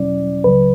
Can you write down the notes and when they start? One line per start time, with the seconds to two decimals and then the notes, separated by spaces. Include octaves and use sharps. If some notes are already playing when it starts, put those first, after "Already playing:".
Already playing: E2 B2 F#3 C#4 E4 D5
0.44 C#2 C#3 F#3 B4